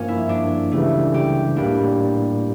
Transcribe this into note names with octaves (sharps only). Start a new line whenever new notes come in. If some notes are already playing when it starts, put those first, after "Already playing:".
Already playing: G2 F3 A#3 C#4
E4
D4
C#2 C#3 E3 G3 A3
G4
A2 G3 A#3 D4